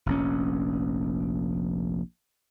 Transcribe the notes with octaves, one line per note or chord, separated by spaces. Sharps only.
F1 A#1 C#4